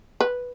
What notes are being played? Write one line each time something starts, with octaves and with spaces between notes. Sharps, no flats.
B4